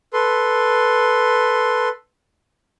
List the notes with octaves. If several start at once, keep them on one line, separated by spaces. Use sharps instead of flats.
A4 B4 C6